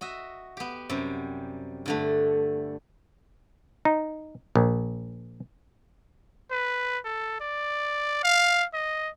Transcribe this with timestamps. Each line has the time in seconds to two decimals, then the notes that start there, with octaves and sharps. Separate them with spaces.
0.01 F#4 D#5 E5
0.57 B3 G4
0.89 F#2 C3 G3
1.86 G2 D3 A3
3.85 D#4
4.55 A#1
6.51 B4
7.05 A4
7.40 D5
8.23 F5
8.74 D#5